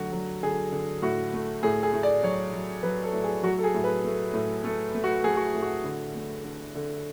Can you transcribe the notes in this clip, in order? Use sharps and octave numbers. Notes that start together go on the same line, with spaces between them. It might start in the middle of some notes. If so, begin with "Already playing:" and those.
Already playing: D3 F#3 A3 F#4
F#3
D3 G#4
D3
A2 F#4
A3
A2 G#4
G#4
A2
D5
F#3 C#5
F#3
F#3 B4
A4
A2
G#4
F#3 F#4
A4
G#4
A2
B4
A3
A2
A3 A4
A3
F#4
A3 G#4
F#4
A2
F#4
D3
A3
D3
D3